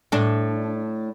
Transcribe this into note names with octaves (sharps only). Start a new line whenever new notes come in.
A2 D4